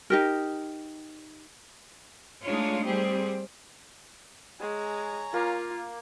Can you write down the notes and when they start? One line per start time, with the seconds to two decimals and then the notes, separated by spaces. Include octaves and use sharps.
0.10 D#4 G4 A#4
2.45 G#3 A3 D4 D#4 F4 C#5
2.86 G3 C4 G4 G#4
4.61 G#3 C#5 G#5 A#5
5.34 A#3 F4